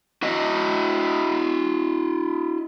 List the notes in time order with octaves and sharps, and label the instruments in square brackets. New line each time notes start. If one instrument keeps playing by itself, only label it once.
[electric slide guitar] E4 F#4 D#5